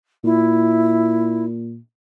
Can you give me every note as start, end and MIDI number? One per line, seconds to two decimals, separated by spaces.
0.24 1.79 46
0.24 1.45 64